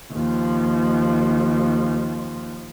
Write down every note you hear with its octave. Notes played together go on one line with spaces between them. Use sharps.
D#2 F3